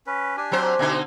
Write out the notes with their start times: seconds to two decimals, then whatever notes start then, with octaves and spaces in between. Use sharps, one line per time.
0.07 C#4 B4
0.37 D4 G4 G#5
0.52 F#3 C4 C5
0.79 B2 D3 D#4